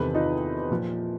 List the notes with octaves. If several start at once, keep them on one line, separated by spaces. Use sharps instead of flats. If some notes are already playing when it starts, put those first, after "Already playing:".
Already playing: E2 C3 D#3 A4 B4
D#4 F4
A#2 F3